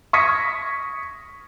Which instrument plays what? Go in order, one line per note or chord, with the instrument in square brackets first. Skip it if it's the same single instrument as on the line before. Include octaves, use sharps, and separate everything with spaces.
[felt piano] C#6 D#6 G#6 A#6 B6 C#7